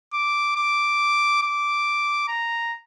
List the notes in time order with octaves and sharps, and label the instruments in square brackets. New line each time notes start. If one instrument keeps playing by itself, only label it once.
[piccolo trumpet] D6
D6
D6
A#5